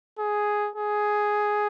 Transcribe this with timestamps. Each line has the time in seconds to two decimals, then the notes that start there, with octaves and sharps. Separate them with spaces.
0.19 G#4
0.76 G#4